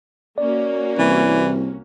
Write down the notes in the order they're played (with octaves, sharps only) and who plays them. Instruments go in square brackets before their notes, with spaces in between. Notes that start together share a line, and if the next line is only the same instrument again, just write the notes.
[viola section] A#3 C#4 F#4 [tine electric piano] D5
[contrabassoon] C2 [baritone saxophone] E3